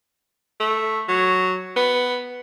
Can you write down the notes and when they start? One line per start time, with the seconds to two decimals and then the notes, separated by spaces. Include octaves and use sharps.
0.60 A3
1.08 F#3
1.76 B3